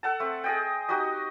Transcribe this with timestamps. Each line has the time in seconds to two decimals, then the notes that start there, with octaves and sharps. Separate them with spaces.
0.03 A4 F#5 A5
0.20 A3 C4
0.44 G#4 D#5 G5
0.89 D#4 F#4 G4 D#5